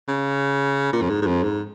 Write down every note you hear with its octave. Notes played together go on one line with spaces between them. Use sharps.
C#3
A#2
F2
G#2
G#2
F2
G#2